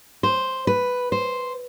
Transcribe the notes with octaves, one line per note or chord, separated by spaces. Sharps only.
C5
B4
C5